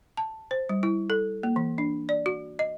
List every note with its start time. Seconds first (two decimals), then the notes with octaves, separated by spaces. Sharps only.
0.17 A5
0.51 C5
0.69 G3
0.83 E4
1.10 A4
1.43 A#3
1.56 E3
1.78 D4
2.09 D5
2.26 F#4
2.59 D#5